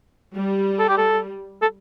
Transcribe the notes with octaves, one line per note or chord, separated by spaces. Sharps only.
G3
A4
G4
A4
A4